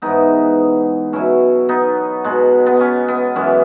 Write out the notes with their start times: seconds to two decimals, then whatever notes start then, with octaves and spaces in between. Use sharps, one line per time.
0.02 G#2 E3 G#3 B3 D#4
1.13 B2 F#3 C#4 E4
1.69 B3 D#4
2.24 B2 G#3
2.66 B3
2.81 C#4
3.08 B3
3.35 F#2 E3 G#3 C#4